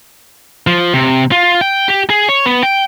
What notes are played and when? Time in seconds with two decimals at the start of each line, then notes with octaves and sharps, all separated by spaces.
0.67 F3
0.93 C3
1.32 F4
1.61 G5
1.88 G4
2.10 G#4
2.29 C#5
2.46 B3
2.63 G5